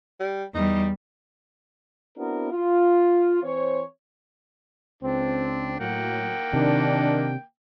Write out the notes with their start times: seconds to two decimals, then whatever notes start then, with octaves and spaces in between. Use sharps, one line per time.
0.20 G3
0.55 E2 G3 D#4
2.17 B3 C4 D4 E4 F#4 A#4
2.52 F4
3.43 E3 C4 C5 C#5
5.03 C#2 C4 D4
5.80 A2 F#3 A#3 F#5 G5
6.53 C3 D#3 D4